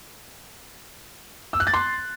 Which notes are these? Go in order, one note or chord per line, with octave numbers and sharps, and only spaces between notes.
E6
F#6
A6
C6